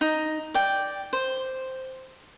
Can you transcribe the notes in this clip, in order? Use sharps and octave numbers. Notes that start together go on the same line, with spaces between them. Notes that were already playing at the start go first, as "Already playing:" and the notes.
D#4
D5 G5
C5